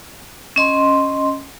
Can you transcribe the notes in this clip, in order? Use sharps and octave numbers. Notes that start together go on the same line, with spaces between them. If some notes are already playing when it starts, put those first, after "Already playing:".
C#4 D#5 C6